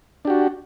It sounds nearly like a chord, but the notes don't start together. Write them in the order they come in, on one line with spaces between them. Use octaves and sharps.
D4 G4 F#4